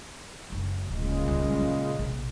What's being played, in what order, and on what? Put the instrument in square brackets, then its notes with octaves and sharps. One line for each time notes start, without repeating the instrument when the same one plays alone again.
[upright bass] F#1 C#2
[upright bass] D1 [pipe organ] A#2 C#3 G#3
[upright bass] C#2 G3
F#3
A#1 C3